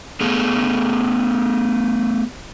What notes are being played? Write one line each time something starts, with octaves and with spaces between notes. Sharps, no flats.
A3 B3 G#4 F5